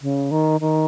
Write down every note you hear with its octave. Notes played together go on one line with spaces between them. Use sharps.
C#3
D#3
D#3